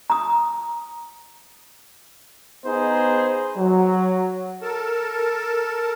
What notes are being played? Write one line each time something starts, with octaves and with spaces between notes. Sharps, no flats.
A#5 D#6
B3 D#4 G#4 C5
F#3
A4 A#4 A5